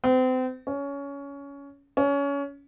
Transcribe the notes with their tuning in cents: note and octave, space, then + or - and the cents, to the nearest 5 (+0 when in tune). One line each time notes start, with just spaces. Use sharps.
C4 -35
C#4 +20
C#4 +25